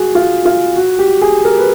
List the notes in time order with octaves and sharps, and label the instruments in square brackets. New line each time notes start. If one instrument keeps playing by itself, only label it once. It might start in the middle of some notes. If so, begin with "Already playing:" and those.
Already playing: [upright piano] F#4 G#4
F4
F4
F#4
G4
G#4
A#4
B4